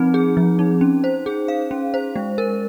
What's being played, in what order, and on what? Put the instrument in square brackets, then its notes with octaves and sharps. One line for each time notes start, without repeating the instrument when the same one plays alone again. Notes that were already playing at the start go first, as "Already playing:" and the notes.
Already playing: [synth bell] F3 C4 D#4
G#4
F3
D#4
C#4
C5
G#4
F5
C#4
C5
G#3
A#4